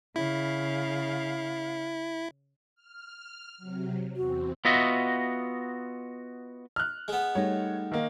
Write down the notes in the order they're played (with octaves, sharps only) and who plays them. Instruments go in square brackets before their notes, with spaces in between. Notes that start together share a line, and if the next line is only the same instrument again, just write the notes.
[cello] C#3 F5 [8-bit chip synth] E4
[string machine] F6
C3 F#3
[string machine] E2 C4 [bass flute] F#4
[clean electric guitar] B3 F4 F#4 D#5 E5
[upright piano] F6 F#6
[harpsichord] G#3 B3
[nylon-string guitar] G3 A3 D#4 [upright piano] C#5
[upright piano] D#3 A#3